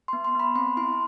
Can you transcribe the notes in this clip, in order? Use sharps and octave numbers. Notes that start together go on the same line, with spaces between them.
B3 C6
C6
B3 B5
C4 C6
E4 C6